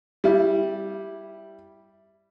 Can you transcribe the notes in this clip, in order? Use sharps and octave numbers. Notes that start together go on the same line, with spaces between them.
G3 E4